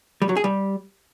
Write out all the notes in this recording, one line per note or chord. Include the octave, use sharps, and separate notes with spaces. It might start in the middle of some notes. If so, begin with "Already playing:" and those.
G3
F#3
G#4
G3